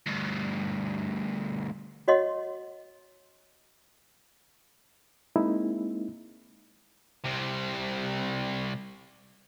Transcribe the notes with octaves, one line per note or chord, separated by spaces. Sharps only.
D2 G2
F#4 C#5 D#5 F#5 C6
G#3 A#3 C4 D#4 E4
C2 C3